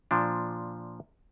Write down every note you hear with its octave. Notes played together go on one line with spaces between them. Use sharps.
A#2 F3 D4